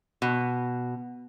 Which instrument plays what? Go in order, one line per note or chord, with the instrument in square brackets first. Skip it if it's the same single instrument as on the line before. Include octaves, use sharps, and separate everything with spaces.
[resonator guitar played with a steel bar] B2